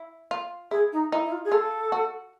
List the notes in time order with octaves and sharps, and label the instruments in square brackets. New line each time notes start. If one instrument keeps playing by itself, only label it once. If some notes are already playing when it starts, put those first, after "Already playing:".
Already playing: [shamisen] E4
F4
[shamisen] E4 [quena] G#4
[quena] D#4
[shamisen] D#4 [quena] E4
[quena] E4
F4
G#4
[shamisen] F4 [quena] A4
[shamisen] F#4